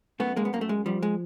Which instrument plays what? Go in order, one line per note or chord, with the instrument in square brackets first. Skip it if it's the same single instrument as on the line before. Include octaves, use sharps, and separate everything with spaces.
[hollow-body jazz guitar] F#2 A3 B3
G#3 A#3
B3
F#2 A#3
A3
G#3
F3 G3
G#3